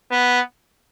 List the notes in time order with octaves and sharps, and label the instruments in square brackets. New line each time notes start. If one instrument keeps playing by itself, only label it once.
[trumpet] B3